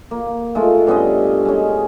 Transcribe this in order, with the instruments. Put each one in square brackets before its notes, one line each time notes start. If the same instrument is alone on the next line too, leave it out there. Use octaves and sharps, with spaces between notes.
[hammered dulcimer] A#3
G#3 A3 F4
G2 B3 C#4 D#5
G#3 C#4